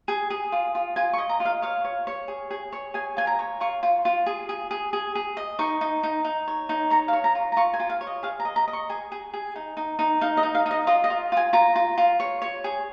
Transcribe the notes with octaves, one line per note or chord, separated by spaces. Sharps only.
G#4
G#4
F4
F4
F4 G#5
C#6
D#5
A#5
F4
F5
C#5 F5
C#5
C#5
G#4
G#4
C#5
G#4 G#5
F4 G#5
A#5
C#5
F4 C#6
F4
F4
G#4
G#4
G#4
G#4
G#4
D#5
D#4 C#6
D#4
D#4
D#4
C#5
D#4
C#5 A#5
F5
C#5
A#5
F4
A#5
F4 C#6
G#5
F4
F5
C#5
D#5
G#4 F5
A#5
D#5
A#5
D#5
C#6
G#4 G#5
G#4
G#4
D#4
D#4
D#4
D#4 F5
D#5
D#4
F5
D#4
D#5
F4 D#5
D#5
F4
F4 G#5
F4 A#5
F4
F4
C#5
C#5
G#4